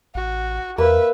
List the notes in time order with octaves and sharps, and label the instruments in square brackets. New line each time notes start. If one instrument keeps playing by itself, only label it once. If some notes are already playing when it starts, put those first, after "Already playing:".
[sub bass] A1 [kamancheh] F#4
[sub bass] E2 [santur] A#3 [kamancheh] B4 E5